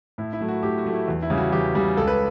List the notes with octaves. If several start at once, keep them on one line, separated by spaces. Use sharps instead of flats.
A2 E4
E4
F#3 A3
F#4
A2 G4
F#4
F#3 A3
E4
E2
E4
C#3 G3
F#4
E2 G4
C#3 G3
C#2 A4
B4